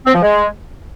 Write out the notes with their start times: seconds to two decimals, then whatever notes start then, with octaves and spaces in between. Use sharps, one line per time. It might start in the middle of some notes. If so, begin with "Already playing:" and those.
0.06 C4
0.14 F3
0.22 G#3